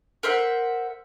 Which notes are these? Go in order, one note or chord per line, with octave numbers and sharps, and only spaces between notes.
A#4 C5 E5 F#5